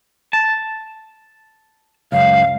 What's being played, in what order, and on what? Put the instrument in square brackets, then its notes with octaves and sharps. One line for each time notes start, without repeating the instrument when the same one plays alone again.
[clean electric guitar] A5
[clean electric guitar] C#2 F#2 [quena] F5